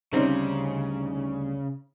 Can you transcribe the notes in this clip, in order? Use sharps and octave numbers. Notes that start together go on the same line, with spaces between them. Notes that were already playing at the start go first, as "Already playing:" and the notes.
D2 C#3 G3 C4 C#4 D#4